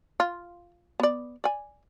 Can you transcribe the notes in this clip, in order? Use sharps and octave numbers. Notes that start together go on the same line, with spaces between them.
F4
B3 D5
D5 G#5